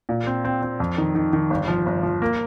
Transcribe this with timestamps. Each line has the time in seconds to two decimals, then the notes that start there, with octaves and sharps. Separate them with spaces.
0.09 A#2
0.27 C4
0.44 C4
0.62 C4
0.80 F2
0.98 D#3
1.15 D#3
1.33 D#3
1.50 G1
1.68 F3
1.86 G1
2.03 F3
2.22 A#3